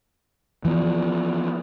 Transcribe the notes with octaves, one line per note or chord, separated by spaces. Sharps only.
E3 F3 B3